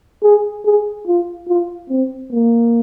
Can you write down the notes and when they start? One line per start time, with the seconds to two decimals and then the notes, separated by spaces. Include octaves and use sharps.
0.23 G#4
0.65 G#4
1.07 F4
1.48 F4
1.90 C4
2.32 A#3